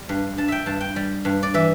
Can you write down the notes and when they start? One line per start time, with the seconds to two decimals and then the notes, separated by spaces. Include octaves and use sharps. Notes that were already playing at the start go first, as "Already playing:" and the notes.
Already playing: G3
0.09 G2
0.38 G2 A5
0.48 E5 G5
0.66 G2 A5
0.81 G5
0.96 G3
1.25 G2
1.43 D5
1.54 E3 E5